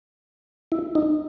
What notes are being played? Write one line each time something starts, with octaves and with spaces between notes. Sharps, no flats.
E4
D#4